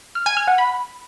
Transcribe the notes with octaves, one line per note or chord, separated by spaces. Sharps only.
F6
G#5
F6
F#5
B5